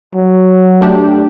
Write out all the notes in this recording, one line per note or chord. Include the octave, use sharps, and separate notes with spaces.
F#3
A3 D4 G4